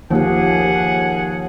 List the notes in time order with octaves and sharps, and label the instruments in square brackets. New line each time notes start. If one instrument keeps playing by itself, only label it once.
[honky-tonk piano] D#2 [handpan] F3 G4 [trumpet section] G#4 F#5